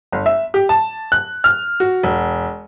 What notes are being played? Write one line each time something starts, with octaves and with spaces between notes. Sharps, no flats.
G1
E5
G4
A5
F#6
F6
F#4
E1